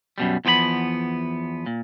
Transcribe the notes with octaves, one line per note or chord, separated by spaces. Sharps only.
F#2 B2 G3
E2 F3 B3 B4 B5
A#2